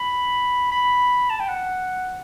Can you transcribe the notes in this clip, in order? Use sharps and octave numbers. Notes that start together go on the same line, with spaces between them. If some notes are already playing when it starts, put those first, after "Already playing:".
Already playing: B5
B5
A5
G5
F#5